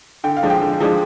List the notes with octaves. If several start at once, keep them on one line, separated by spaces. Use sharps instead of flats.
D3 G5
F5
F3 G#3 D4
G5
D3
F3 G#3 D4